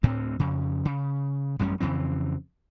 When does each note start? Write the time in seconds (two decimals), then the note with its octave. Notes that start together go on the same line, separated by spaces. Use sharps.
0.03 D2 A2 C4
0.39 F2 C#3
0.85 C#3
1.59 A1 F#2 G3 C#4
1.80 F2 C#3 E3 C4